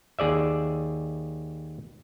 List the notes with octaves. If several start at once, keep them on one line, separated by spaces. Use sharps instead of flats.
D#2 G#4 D5 E5